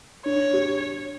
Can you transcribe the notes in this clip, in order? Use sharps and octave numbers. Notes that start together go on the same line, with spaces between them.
D4 C#5
G4